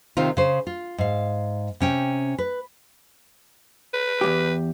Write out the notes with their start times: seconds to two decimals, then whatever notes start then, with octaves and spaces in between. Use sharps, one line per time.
0.17 C3 D#3 C4 D#4 F4
0.37 C#3 C5
0.67 F4
0.98 G#2 F5
1.80 C3 C#4 G5
2.38 B4
3.94 B4
4.21 E2 G2 G4